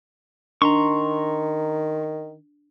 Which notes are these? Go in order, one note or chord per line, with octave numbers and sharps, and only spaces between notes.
D#3 D4 A#5 C6 C#6